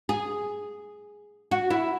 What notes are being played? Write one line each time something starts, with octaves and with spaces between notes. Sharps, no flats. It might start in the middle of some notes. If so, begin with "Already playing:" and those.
G#4
F#4
E4